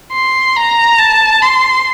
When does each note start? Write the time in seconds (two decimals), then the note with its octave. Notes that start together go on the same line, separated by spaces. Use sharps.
0.13 C6
0.56 A#5
0.99 A5
1.42 C6